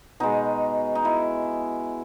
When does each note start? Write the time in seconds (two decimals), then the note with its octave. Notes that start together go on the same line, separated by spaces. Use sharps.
0.20 B2 G#3 D#4
0.95 D#4
1.05 E4